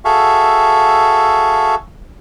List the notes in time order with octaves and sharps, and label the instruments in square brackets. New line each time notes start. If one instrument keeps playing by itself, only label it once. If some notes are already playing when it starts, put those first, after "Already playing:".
[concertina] F#4 G#4 A4 E5 F5